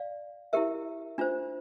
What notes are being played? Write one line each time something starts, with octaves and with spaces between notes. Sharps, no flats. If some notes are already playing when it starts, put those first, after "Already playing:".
Already playing: D5 F5
E4 G4 A#4 E5
D4 F4 C5